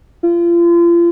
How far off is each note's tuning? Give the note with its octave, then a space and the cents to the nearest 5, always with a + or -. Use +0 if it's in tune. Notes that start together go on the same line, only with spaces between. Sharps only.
F4 -35